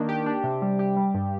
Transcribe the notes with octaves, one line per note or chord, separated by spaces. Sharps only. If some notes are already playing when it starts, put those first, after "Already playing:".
Already playing: D#3 A#3 D4
G4
D4
C3
G3
G4
G3
G2